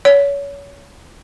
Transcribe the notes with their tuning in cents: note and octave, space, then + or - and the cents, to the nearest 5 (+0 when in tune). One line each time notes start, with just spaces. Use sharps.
C#5 +30